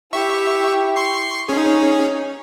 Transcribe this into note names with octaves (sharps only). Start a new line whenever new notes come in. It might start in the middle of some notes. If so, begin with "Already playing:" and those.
E4 G4 E5 C#6
C6 C#6 C7
C#4 D#4 G#4 C#5